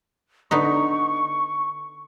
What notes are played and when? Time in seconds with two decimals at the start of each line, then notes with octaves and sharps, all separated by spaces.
0.51 D3 B3 D#4 C#6